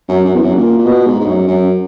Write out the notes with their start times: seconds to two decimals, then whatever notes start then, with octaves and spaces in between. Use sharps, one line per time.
0.09 F#2
0.25 F#2
0.34 E2
0.43 F#2
0.55 A#2
0.78 A#2
0.86 B2
1.07 G#2
1.20 G#2
1.26 F#2
1.47 F#2